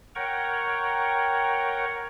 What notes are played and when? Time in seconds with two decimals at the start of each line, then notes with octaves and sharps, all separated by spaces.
0.15 A#4 C#5 F#5 G5 A#5 C#6